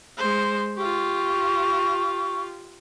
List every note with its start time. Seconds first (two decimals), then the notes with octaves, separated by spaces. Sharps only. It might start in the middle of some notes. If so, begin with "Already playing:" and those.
0.17 G#3 C5
0.77 F4 G4 C#6